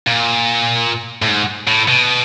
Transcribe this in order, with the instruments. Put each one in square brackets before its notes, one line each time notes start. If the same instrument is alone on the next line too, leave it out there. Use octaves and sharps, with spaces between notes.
[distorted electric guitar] A#2
A2
G#2
A2
B2